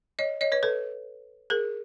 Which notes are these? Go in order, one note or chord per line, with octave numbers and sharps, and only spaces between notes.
C#5 D#5
C#5 D#5
B4 C#5
A4 B4
G#4 A#4